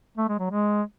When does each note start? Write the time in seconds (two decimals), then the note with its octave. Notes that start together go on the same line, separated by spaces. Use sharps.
0.17 A3
0.29 G#3
0.39 F#3
0.50 G#3